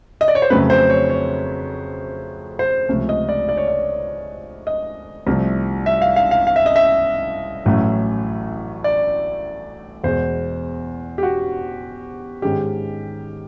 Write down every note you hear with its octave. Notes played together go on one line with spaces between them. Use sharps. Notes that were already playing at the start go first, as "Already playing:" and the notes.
D#5
D5
C#5
C5
F2 C#3 F#3 A3 C4 B4
C5
C#5
C#5
C5
C#2 C3 F3 A3 C#4
D#5
D5
D5
C#5
D5
D#5
C2 C3 F3 A3
E5
F5
F5
F5
F5
E5
D#5
E5
A1 A2 F#3 A3 C#4
D5
E2 B2 G#3 C5
G4
F#4
G#2 D#3 G#3 C#4 G4